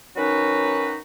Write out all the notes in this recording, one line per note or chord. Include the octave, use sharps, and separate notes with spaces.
D#3 F#3 C#4 D#4 F#4 B4